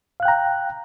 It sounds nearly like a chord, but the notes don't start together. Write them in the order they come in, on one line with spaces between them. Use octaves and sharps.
F5 F#6 G5 A#5